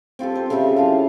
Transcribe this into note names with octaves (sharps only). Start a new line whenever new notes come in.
C4 F4 G4 A4
C5
C#3 F4 G4 E5
E4 F4 F5 A5